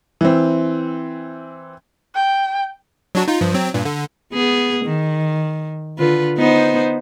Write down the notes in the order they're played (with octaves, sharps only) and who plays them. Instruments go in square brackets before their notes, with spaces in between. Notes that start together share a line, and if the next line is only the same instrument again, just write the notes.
[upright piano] E3 C4
[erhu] G5
[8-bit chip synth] F#3 D4 F#4
D#4 F4
G2 F3
F#3 C4
G2 A#2
D3
[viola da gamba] B3 G#4
D#3
D3 F4 B4
B3 D#4 C5